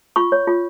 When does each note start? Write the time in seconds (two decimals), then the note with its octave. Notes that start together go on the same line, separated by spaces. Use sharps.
0.16 F4 C#6
0.32 C#5
0.47 F4